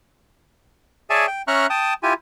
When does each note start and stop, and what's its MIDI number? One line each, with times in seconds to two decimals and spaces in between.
1.10 1.26 68
1.10 1.26 73
1.10 1.26 74
1.10 1.26 76
1.10 1.26 80
1.10 1.26 81
1.27 1.42 79
1.48 1.67 61
1.48 1.67 76
1.48 1.67 82
1.48 1.67 85
1.48 1.67 89
1.48 1.67 90
1.70 1.94 79
1.70 1.94 81
1.70 1.94 87
2.03 2.14 64
2.03 2.14 65
2.03 2.14 67
2.03 2.14 80